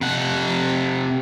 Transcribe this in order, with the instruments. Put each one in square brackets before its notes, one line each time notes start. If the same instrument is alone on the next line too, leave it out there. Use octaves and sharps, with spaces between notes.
[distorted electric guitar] C3 F#5